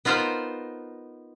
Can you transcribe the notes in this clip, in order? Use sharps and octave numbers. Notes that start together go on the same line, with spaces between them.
B3 D#4 F4 A#4 C5